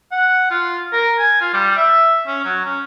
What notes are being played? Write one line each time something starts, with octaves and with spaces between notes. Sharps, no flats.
F#5
F4
A#4
G#5
F4
G3
E5
C#4
F#3
C#4